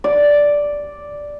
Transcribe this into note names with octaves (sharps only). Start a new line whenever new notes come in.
D5